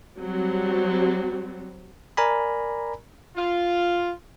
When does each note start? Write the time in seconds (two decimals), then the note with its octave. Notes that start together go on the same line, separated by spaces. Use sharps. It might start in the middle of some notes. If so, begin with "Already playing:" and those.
0.18 F#3 G3 C4 F#4
2.17 A#4 D5 G#5 A#5 B5
3.36 F4